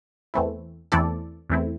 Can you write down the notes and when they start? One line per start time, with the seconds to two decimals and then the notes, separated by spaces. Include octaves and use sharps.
0.34 E2 E3 A3 C4 E4
0.92 E2 E3 A3 C4 E4 A4 D5
1.50 E2 E3 A3 C4 E4